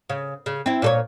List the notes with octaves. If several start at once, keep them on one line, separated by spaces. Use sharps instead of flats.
C#3
C#3
C4 E4
A#2 A4 C#5